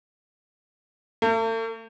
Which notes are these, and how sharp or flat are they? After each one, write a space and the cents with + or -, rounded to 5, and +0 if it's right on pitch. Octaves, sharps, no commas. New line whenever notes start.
A3 +45